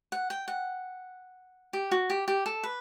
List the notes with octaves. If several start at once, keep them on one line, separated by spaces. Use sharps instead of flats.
F#5
G5
F#5
G4
F#4
G4
G4
A4
B4